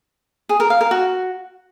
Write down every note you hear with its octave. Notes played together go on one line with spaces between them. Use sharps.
G#4
A#4
F5
A#4
F#4